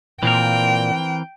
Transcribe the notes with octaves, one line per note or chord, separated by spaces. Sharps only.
A#2 E3 C4 A#4 G5